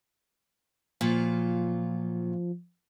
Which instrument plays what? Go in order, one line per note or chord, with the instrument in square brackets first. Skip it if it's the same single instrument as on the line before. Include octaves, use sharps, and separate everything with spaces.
[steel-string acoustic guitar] A#2 F#3 F4 [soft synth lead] F3